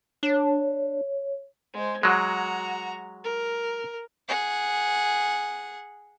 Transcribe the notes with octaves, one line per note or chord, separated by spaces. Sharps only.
D4 C#5
G#3 C5
F#3 G#3 F#4 A#5
A#4
G#4 F#5